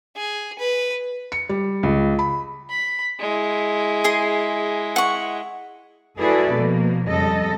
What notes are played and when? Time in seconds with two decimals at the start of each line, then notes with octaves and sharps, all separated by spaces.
0.16 G#4
0.59 B4
1.32 C#7
1.49 G3
1.83 C#2
2.19 B5
2.70 B5
3.20 G#3 E4
4.04 G#4 C6
4.96 F#5 C#6
6.19 E4 F#4 G#4 A4 B4 D5
6.54 B2 F3 A#3
7.09 F2 C#3 G3 A4 D#5